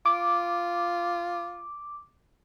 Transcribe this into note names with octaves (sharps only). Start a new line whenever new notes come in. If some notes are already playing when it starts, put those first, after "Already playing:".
F4 D6